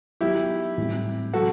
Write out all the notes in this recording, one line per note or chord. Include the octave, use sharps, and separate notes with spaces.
F#3 B3 D#4 E4 F#4 G4
A2 E3 G3 C4
C3 F#3 C4 F#4 A4